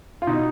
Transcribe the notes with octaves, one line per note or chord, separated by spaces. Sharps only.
F4
B2 D#4